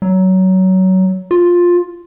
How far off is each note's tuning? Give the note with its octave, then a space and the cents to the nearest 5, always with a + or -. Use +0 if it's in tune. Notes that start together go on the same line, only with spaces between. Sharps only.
F#3 +20
F4 +10